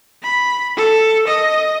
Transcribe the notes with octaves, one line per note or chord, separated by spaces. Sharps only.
B5
A4
D#5